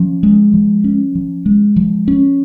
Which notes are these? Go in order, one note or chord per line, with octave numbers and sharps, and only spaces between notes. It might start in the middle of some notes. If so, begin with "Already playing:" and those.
Already playing: F3 C#4
G#3
F3
C#4
F3
G#3
F3
C#4